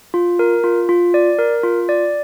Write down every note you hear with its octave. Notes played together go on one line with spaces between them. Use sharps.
F4
A#4
F4
F4
D5
A#4
F4
D5